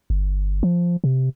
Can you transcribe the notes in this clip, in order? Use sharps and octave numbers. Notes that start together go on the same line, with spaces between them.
G1
F3
C3